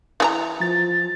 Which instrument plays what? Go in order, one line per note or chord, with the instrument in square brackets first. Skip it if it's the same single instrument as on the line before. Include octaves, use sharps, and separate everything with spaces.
[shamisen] E3 G4 A#5
[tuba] F3 [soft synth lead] A6